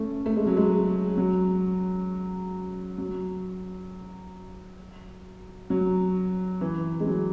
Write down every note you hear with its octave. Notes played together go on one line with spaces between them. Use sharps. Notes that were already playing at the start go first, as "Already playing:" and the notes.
Already playing: A3 C#4
A3
G#3
F#3
G#3
F#3
F#3
F#3
E3
G#3
F#3